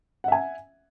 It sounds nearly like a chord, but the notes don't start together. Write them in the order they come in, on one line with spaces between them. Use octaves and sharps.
F#5 E5 G#5